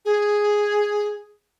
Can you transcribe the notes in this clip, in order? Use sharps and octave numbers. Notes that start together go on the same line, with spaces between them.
G#4